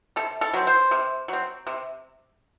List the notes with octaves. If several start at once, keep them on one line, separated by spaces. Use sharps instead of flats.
C3 A4
A4
F#3 C4
C5
C3
F#3 C4
C3